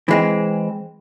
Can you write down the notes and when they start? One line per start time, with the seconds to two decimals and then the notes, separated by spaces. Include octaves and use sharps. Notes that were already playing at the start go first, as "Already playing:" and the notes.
0.08 E3 G#3 C4